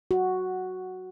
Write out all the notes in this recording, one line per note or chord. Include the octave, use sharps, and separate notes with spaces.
F#4